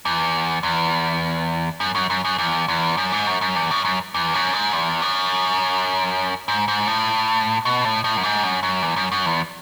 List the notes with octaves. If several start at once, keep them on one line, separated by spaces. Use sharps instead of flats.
E2
E2
F#2
F#2
F#2
F#2
E2
E2
F#2
G#2
F#2
F#2
E2
F#2
F#2
E2
F#2
G#2
E2
F#2
G#2
G#2
A2
B2
A2
A2
F#2
G#2
F#2
F#2
E2
F#2
F#2
E2